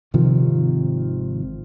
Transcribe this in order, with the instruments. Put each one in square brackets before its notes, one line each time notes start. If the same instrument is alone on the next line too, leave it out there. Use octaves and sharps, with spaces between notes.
[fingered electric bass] G#1 C3 D#3 F3